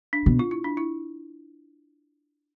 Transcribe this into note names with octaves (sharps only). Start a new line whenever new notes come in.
D4
B2
F4
E4
D4
E4